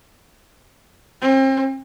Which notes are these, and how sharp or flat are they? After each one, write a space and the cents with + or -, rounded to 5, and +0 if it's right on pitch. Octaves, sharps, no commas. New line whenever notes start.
C4 +35